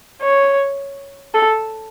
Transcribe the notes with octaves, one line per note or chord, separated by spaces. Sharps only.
C#5
A4